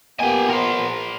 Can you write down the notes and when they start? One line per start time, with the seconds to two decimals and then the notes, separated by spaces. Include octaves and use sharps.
0.20 A#3 B3 G4 G#5
0.49 A#4 C5